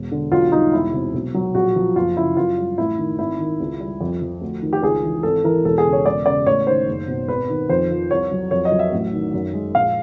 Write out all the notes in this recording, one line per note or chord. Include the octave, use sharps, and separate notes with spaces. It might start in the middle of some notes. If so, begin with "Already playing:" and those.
Already playing: E1
D3
B1 F4
G3 D#4
E1 E4
C3
B1
F#3
A#1 F#4
F3
F#1 F4
C#3 E4
F#2 F4
G3
A1 E4
D#3
G#1 E4
D#3
C#2
G3
F2
F3
D2
D#3
G4
C#2 G#4
E3
G#1 A4
E3 A#4
E1 A4
G#4
C#3
C#5
E1 D5
C#3 D5
A1 C#5
D#3 C5
F#1
B2
G#1 B4
D#3
F2 C5
F3
C2 C#5
F#3
F2 C#5
D#5
F#3
E5
A1
D#3
F#2
G#3
A#1 F5